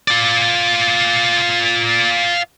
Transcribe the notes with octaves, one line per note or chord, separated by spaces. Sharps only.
F4 D5